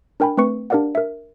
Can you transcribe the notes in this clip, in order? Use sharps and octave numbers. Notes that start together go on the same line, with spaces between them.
D4 A#4 G5 G#5 B5
A3 C4 B4 C#6 C#7
D4 G4 A#4 D5 F5 F#5
A#4 E5